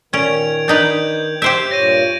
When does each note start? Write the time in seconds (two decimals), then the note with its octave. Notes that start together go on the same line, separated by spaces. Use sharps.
0.13 A#2 D#3 C#4 G#6 D7 F7
0.68 D4 D#4 B4 G6 F#7
1.42 G4 C5 E5 G6 D7
1.71 G2 A#2 C#5 A#6 D#7